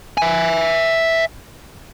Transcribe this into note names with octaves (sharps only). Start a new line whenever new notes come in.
E5 G#5